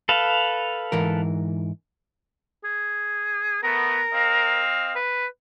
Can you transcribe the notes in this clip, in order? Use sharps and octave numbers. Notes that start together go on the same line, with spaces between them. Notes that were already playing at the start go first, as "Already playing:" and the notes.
A4 B4 F5
G#2 E3 A#4
G#4
A3 B3 A#4
C4 D#5 F5
B4